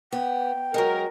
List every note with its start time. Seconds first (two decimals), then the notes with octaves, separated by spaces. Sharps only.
0.12 B3 G5
0.74 F#3 G#3 A#4